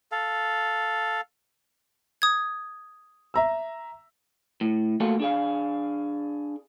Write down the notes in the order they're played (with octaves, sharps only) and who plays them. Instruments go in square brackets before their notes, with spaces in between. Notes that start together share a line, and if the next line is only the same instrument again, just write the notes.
[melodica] A4 F5
[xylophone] D#6 G#6
[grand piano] E5 A#5 E6
[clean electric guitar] A2
A3 A#3 F4 F#4 A4
D4 G#4 F5